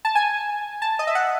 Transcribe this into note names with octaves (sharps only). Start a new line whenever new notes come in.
A5
G#5
A5
D#5
E5
F#5